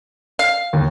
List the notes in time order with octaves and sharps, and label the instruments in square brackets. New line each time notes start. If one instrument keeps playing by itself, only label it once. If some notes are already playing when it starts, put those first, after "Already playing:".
[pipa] F5
[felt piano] D#2